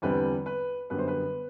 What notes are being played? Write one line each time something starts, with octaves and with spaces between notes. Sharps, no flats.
E2 D3 G3 C4 B4
B4
F#2 D3 G3 B3 B4
C5
B4